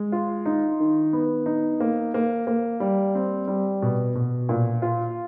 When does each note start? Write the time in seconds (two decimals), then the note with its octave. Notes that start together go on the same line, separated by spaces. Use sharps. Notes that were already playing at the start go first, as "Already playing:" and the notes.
Already playing: G#3
0.12 F4
0.45 D#4
0.80 D#3
1.13 B3
1.46 D#4
1.80 A#3
2.14 A#3
2.47 A#3
2.80 G3
3.15 C4
3.48 G3
3.82 B2
4.15 B2
4.49 A#2
4.82 F4